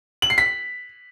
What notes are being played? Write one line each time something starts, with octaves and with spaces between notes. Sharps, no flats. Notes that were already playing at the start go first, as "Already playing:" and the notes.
F#7
C7
B6